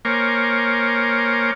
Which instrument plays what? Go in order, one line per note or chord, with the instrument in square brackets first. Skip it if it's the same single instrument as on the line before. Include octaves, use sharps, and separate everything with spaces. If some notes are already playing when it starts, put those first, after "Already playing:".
[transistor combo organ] A#3 A#4 C5 C#5 G#5 D6